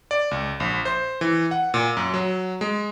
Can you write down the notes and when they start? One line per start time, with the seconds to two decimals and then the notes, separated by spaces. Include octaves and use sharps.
0.11 D5
0.31 C#2
0.60 A#1
0.85 C5
1.21 E3
1.51 F#5
1.74 A#2
1.97 F#2
2.14 F#3
2.61 G#3